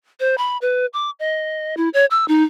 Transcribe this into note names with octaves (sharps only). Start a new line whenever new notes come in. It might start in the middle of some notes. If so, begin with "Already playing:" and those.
C5
B5
B4
D6
D#5
E4
C#5
E6
D#4